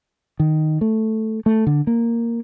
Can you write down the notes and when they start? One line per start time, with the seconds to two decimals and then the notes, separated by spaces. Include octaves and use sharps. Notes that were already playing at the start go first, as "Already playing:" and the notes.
0.40 D#3
0.81 A3
1.46 A3
1.67 D3
1.87 A#3